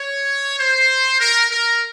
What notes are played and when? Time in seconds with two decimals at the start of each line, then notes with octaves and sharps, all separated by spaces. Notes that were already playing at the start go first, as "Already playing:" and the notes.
Already playing: C#5
0.59 C5
1.20 A#4
1.51 A#4